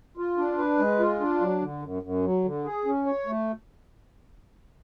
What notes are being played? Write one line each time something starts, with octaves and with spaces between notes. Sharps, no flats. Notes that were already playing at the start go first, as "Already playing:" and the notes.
F4
D4
B4
G#3
F4
D4
F#3
D3
F#2
F#2
F#3
D3
G#4
C#4
C#5
A3